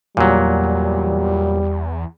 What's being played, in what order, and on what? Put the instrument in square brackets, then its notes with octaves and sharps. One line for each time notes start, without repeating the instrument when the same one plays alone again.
[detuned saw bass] E2 [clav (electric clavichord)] A#2 F#3 [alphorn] G3